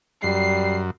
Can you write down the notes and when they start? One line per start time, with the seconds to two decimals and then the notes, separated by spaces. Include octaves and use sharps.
0.24 F#2 G3 C7